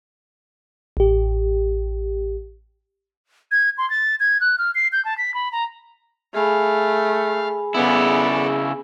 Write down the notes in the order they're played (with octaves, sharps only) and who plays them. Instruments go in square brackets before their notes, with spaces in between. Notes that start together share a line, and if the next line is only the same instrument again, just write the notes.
[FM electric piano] A1 G4
[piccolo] G#6
C6
A6
G#6
F#6
F6
C7
G6
A5
B6
B5
A#5
[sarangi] A3 [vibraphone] G#4 G#5 B5 [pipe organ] F5
[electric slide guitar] C#3 E4 [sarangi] B3 [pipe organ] A4 D5